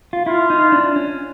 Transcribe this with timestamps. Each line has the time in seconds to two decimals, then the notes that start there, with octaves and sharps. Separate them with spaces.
0.13 F4
0.26 E4 F4
0.50 D#4
0.72 D4
0.96 C#4